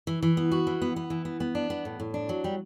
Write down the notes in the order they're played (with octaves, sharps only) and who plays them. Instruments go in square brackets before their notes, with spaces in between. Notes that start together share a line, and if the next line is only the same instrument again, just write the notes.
[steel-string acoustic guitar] E3
E3
B3
F#4
E3
B3
B3
E3
B3
B3
D4
B3
A2
A2
D4
F#3
G3